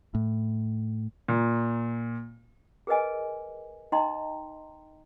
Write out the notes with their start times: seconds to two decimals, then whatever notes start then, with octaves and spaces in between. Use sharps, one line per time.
0.15 A2
1.28 A#2
2.87 G#4 A#4 B4 D#5 G#5
3.92 D#4 D#5 G5 A#5 C6